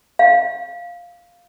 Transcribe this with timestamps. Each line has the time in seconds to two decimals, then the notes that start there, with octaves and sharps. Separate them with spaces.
0.19 F5